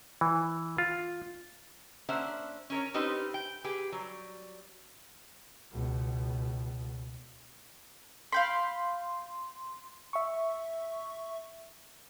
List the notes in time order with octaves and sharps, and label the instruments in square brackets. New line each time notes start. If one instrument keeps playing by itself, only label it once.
[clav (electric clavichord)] E3
F4
[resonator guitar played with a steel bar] A#3 C#4 D4 C5 E5 F#5
C#4 A#4 C#5
C4 C#4 D#4 G4 B4 C5
G5
G4 G#4 B4
F#3 G3
[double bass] C#2 B2
[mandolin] F5 G5 B5 [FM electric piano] C6
[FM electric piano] E5 C#6